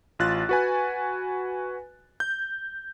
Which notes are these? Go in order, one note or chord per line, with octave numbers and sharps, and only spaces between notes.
A1 F4 F#6 A6
F#4 B4 G#5
G6